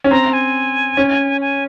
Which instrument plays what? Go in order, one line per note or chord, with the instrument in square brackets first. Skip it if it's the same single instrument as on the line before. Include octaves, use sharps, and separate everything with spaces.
[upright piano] C#4
[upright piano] C4 [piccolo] A#5
[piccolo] G#5
[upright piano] C#4
[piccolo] G#5